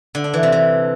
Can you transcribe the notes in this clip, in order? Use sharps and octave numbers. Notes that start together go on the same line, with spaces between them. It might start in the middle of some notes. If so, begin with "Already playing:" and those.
D3
D4
E3
C3
E3